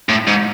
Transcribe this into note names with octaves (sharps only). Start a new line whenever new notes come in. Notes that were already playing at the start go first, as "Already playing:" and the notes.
A2
G#2